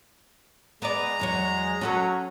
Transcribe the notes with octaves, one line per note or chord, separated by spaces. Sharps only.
G#3 B3 D5 A#5
E2 F#3 C#5
F#3 C#4 F#4 A4